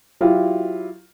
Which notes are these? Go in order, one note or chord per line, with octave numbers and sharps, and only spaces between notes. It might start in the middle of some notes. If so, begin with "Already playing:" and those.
F#3 E4 F4 G4